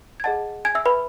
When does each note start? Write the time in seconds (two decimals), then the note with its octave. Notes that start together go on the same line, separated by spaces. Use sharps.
0.20 G#6
0.24 G#4 D#5 F#5 A5 A6
0.65 G#5 G#6
0.75 E5 E6
0.86 B4 B5